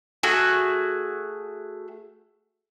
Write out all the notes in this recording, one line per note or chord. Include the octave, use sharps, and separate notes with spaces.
A3 F#4 G#4